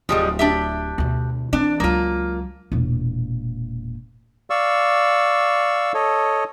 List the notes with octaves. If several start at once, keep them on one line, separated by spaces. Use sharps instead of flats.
D1 F3 G3 G#3
D4 G4 E5
D2 B2
E3 C4 D4
C#2 F#3 A#3 F4
E1 A#2
D5 F5 C#6 E6
A4 C#5 D#5